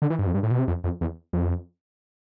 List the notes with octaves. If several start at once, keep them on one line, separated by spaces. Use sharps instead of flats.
D3
E3
G2
F2
G2
A2
B2
C3
F2
F2
E2
F2